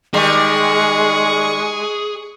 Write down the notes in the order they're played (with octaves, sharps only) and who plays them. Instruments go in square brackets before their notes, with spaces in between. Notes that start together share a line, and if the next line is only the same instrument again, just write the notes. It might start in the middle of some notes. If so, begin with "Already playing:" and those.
[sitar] D#3 G3 [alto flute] G#3 [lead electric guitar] G#4 [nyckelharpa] C#6